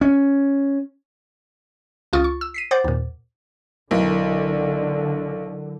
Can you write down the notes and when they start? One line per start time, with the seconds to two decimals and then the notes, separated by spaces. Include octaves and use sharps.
0.01 C#4
2.13 C#2 F4 C#6 D#6 A6
2.24 C#6
2.41 E6
2.54 B6 C7 D#7
2.71 C5 F#5 D6 G6 A6
2.84 D#2 A#2
3.91 B1 D3 F#3 E4 A#4